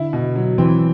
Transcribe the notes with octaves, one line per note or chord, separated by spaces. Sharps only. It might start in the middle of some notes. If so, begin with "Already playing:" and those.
Already playing: D3 E4
B2
F#3
E3 C4